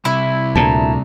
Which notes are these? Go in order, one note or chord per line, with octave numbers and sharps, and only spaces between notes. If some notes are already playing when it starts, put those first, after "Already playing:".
C2 C3 E4
D2 A#2 A5 A#5